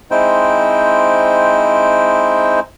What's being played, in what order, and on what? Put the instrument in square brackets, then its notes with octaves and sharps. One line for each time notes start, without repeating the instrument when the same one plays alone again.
[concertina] G#3 C4 D#4 E4 C5 G5